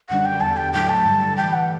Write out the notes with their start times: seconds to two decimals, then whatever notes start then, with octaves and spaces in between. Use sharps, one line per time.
0.09 F#2 D3 G3 D4 F#5
0.25 G5
0.41 E2 D3 G3 A5
0.57 G5
0.73 A2 F#3 A3 D4 G5
0.89 A5
1.05 G2 D3 G3
1.37 A2 E3 G3 G5
1.53 F#5